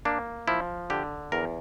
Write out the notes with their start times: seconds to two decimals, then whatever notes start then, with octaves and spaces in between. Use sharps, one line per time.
0.05 A#3 D4
0.48 F3 E4
0.90 D3 G4
1.32 E2 A#4